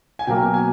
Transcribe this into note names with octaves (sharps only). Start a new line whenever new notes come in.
G#5
B2 F#3 A#3 G5
G#5